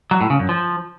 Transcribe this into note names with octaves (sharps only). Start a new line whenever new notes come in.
F#3
A2
C#3
F#2
F3